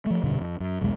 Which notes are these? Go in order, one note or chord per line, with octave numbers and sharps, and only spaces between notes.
F3 A3
F1 G2 B2 D3
F2
F#2
B1 E2 B2 G#3